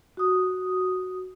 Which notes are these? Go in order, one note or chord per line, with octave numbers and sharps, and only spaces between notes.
F#4 D#6